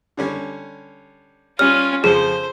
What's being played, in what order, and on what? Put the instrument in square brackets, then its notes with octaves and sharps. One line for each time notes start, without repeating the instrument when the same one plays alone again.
[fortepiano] D3 G3 C#4
[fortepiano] G3 [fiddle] C#4 F4 [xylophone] F6
[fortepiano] F2 C#3 F3 [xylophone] G#4 [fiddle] C5